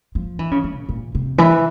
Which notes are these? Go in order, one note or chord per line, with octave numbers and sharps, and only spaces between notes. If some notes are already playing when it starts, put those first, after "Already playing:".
F3
E3
C#3
E3
A#2
A#2
C3
E3